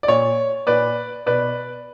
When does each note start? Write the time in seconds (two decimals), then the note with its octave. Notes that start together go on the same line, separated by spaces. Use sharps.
0.03 D5
0.08 A#2 C#5
0.67 A#2 B4 D5
1.26 B2 B4 D5